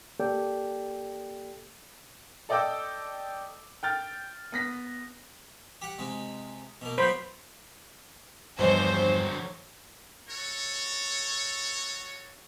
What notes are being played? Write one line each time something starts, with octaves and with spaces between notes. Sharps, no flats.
A#3 G4 A4 D5 G5
A4 D5 D#5 G5 D6 E6
G5 F6 A6
B3 A#6 B6
G4 F#5
C3 G#3
B2 A#3
F#3 B3 C5 B5
E2 G2 D3 F3 F#3 C5 D#5
F#4 A4 C#5